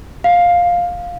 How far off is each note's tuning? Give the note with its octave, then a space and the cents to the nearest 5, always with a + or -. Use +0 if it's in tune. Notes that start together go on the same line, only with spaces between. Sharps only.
F5 +10